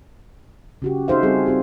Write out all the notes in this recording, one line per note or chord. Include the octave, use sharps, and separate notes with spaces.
C#3 F#4 G4
D#4 F#4 G#4 C5 E5 F5
G3 C4 G#4 A4
C4 F4 G4